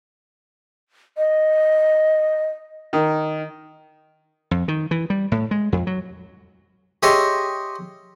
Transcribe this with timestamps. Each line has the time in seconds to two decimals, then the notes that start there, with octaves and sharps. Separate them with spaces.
1.17 D#5
2.93 D#3
4.51 F2
4.68 D#3
4.91 E3
5.10 G3
5.32 A2
5.51 G#3
5.72 F2
5.87 F#3
7.03 G4 G#4 C#5 D#5 E5 C6